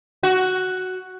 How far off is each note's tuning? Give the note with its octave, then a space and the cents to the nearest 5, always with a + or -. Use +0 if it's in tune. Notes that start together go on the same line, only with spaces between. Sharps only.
F#4 +5